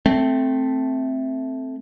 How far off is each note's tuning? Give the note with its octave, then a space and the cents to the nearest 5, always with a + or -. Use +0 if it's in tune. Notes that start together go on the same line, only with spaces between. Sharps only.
A3 +0 C4 +0